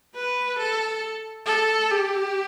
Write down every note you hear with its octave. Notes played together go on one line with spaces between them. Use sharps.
B4
A4
A4
G4